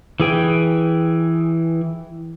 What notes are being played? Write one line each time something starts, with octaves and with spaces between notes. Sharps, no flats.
E3 G#4 G5